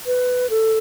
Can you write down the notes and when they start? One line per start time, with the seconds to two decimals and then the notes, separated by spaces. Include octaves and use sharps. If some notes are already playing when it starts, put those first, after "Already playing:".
0.06 B4
0.50 A4